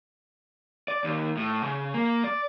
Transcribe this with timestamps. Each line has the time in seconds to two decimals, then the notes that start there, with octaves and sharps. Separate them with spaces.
0.88 D5
1.04 D#2
1.37 A2
1.62 C#3
1.94 A#3
2.24 D5